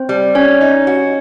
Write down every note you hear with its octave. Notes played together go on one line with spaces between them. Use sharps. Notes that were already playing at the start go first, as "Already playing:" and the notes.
Already playing: C4 C5
G3
G3 C#4 C#5
D#4
F#4